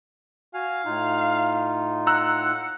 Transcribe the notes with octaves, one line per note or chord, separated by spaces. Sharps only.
F#4 F5 G#5
A2 D#4 F4
F#5 A#5 E6 F#6